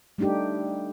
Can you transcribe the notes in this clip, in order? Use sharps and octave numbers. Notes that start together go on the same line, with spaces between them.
G3 A3 D4 D#4 G4